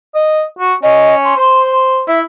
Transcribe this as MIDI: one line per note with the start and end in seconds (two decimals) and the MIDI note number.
0.15 0.44 75
0.59 0.74 66
0.83 1.33 61
0.83 1.15 75
1.25 1.77 84
1.37 2.02 72
2.08 2.22 64
2.08 2.19 76